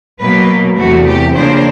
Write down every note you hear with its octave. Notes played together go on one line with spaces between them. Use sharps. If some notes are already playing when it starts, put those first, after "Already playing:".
B2 F#3 A#3 B4
E2 C3 E3 A3 F#4
G4
C#3 F3 A#3 D4 C5